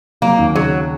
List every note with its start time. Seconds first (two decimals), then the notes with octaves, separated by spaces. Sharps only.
0.22 F#3 A#3
0.38 D#2
0.55 C#3 F#3